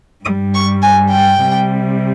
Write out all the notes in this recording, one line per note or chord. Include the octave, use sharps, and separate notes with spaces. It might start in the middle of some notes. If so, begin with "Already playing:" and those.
G2 G3 D#6
C#6
G#5
G5
C3 G3